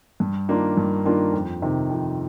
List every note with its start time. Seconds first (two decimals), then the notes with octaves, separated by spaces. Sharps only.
0.20 G2
0.49 D#3 A#3 D4 F4
0.77 G2
1.05 D#3 A#3 D4 F4
1.33 F2
1.62 C3 D#3
1.90 F2